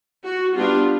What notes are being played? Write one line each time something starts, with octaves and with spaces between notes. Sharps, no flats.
F#4
G3 B3 D4 F4